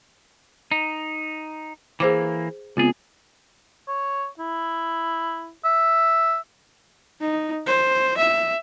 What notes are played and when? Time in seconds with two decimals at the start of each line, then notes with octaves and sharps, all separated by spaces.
0.71 D#4
2.00 E3 A#3 G#4 C5 D6
2.77 C#2 B3 C4 F4 G#4
3.88 C#5
4.39 E4
5.65 E5
7.21 D#4
7.66 C5
8.17 E5